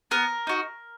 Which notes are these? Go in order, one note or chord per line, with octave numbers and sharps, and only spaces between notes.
B3 A#4
D#4 F#4